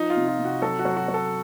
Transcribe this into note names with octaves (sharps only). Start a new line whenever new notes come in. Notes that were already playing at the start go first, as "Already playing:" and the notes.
Already playing: F3 D#4
F4
C3
F4
C3
F#4
F#3 A4
F#4
F#3
F#4
F#3
A4